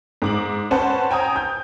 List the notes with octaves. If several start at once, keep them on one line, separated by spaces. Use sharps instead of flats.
G#2 D6 F#7
C#4 B4 C5 F#5 A5
G5 G#5 A#5 D#6
G6